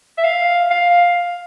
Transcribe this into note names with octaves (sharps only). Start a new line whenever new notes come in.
E5
F5
F5